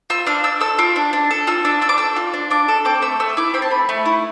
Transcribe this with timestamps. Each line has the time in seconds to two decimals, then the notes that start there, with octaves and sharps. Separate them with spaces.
0.10 F4 E6
0.27 D4 F6
0.44 D4 E6
0.61 A4 E6
0.79 F4 D6
0.96 D4
1.13 D4
1.31 A4
1.47 F4 E6
1.65 D4 E6
1.82 D4 E6
1.89 D6
1.98 A4 E6
2.16 F4
2.34 D4
2.50 D4 D6
2.68 A4
2.85 C4 D6
3.02 A3 E6
3.20 A3 E6
3.37 E4 D6
3.54 C4 B5
3.62 A5
3.71 A3 B5
3.89 A3
4.05 E4